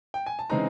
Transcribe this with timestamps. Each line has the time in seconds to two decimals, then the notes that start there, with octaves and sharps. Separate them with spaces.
0.14 G5
0.26 G#5
0.39 A5
0.50 C#3 E3 G#3 C4 D#4 A#5